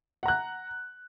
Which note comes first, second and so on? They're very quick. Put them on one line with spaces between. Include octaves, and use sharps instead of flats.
F#5 A#5 F#6